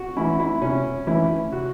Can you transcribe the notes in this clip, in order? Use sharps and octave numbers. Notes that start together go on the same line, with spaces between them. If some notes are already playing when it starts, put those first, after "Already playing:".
Already playing: F#4
E3 A3 C#4 E4
E4
C3 C#4
E3 A3 C#4 E4
C3 F#4